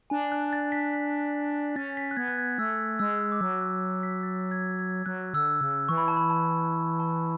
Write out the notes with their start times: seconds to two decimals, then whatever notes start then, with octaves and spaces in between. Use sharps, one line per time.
0.10 D4 G#5
0.32 F#6
0.53 A6
0.72 B6
0.93 B6
1.76 C#4 A6
1.97 B6
2.11 F#6
2.17 B3 G#6
2.28 F#6
2.38 G#6
2.58 A3 E6
2.99 G#3 E6
3.32 D6
3.41 F#3 E6
3.61 F#6
4.03 B6
4.23 A6
4.51 G#6
4.79 G#6
5.06 F#3 F#6
5.34 D3 E6
5.61 C#3
5.89 E3 C#6
5.98 B5
6.08 A5
6.16 B5
6.30 A5
7.00 A5